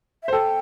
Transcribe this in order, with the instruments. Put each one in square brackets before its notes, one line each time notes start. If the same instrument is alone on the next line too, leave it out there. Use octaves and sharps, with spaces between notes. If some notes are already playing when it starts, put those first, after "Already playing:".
[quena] E5
[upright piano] C5
[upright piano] A4 [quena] G5